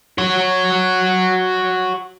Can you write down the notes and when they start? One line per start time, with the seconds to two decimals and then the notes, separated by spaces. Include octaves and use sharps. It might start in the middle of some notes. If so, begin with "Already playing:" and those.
0.18 F#4 C#5